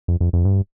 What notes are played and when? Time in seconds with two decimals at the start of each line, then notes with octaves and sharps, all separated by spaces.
0.08 F2
0.21 F2
0.33 F2
0.45 G2